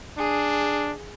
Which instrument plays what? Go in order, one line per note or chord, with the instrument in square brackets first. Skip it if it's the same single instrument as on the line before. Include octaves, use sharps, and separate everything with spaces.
[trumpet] D4 [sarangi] G#4